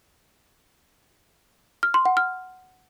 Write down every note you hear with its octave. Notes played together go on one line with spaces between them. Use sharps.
F6
C6
F#5
F6